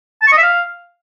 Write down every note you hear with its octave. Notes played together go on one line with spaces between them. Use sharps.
A5
C#6
D#5
E5
F5